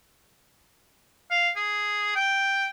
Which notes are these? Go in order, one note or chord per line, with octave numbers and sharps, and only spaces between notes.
F5
G#4
G5